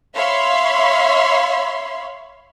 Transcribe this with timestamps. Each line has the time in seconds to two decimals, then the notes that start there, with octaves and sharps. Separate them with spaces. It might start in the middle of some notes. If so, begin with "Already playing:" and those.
0.16 C#5 E5 F5 B5 C6